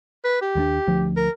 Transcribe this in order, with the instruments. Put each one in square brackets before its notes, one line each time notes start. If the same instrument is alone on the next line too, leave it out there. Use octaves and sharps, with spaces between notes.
[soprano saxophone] B4
G4
[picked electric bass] D#2 G3 D4
D2 F3
[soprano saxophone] A#4